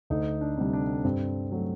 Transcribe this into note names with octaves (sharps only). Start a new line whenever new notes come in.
D2 D#4
D4
C3 G3
D4
G2 C4
F#3 A3